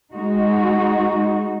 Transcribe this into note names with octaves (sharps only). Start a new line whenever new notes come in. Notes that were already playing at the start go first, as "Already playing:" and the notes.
G#3 D#4 F#4